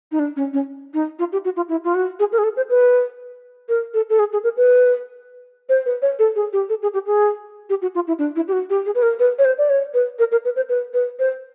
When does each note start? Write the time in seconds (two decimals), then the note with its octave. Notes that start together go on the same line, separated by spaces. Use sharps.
0.12 D#4
0.19 D4
0.36 C#4
0.53 C#4
0.94 D#4
1.19 F4
1.32 G4
1.45 F#4
1.56 F4
1.69 E4
1.84 F4
1.95 F#4
2.20 G#4
2.32 A#4
2.38 G#4
2.44 A4
2.57 C5
2.70 B4
3.69 A#4
3.94 A4
4.10 A4
4.19 G#4
4.32 G#4
4.44 A#4
4.57 B4
5.69 C5
5.86 B4
6.02 C#5
6.19 A4
6.36 G#4
6.53 G4
6.69 A4
6.82 G#4
6.94 G4
7.06 G#4
7.70 G4
7.82 F#4
7.95 F4
8.07 E4
8.19 D4
8.36 E4
8.48 G4
8.53 F#4
8.70 G4
8.86 G#4
8.95 B4
9.02 A#4
9.19 B4
9.39 C#5
9.45 C5
9.58 D5
9.70 C#5
9.94 B4
10.19 A#4
10.32 A#4
10.45 B4
10.56 C5
10.69 B4
10.94 B4
11.19 C5